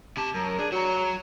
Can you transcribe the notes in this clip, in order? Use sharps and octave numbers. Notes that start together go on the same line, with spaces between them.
C3 G4 A5
F#2 A#4
D4 G#4
F#3 F#4 A#5